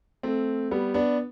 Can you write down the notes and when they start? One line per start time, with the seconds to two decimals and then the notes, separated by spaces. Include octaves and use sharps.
0.23 A3 C4
0.71 G3 B3
0.94 B3 D4